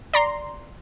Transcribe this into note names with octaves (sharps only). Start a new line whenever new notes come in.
D5 A#5 C6